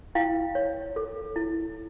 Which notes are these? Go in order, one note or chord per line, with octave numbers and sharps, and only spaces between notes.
E4 F5 G5
C#5
A4
E4